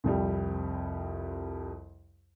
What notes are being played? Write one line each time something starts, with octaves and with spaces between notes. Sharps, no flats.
C2 F2 G3